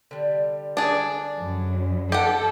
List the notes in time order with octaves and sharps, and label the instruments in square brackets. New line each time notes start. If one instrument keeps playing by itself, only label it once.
[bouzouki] D3 G3
[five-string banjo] D4 G#4
[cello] F#2
[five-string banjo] G4 F#5 [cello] A4